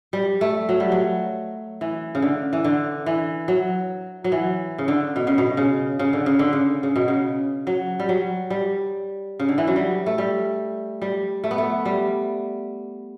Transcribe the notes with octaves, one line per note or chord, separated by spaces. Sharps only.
G3
A3
F#3
G3
F#3
E3
C#3
D3
E3
D3
E3
F#3
F#3
E3
C#3
D3
B2
C#3
B2
C#3
C#3
D3
C#3
D3
C#3
C#3
B2
C#3
F#3
G3
F#3
G3
C#3
D3
E3
F#3
G3
A3
G3
G3
A3
B3
A3
G3